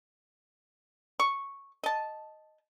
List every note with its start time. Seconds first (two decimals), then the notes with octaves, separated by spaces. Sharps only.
1.20 C#6
1.83 D#5 A5